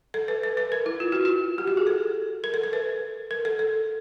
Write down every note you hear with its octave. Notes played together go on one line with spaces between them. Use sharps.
A4
B4
B4
B4
A#4
E4
F4
F#4
F4
G4
F#4
G#4
A4
A#4
A4
A#4
B4
A#4
A4
A4